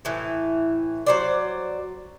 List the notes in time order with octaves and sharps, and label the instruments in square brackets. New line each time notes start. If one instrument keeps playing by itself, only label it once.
[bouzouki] A2 E3
F#3 C5 D5